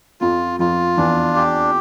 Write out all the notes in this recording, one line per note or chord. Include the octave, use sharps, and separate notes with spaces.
F2 F3 F4
F2 F3 F4
E2 E3 D4
G4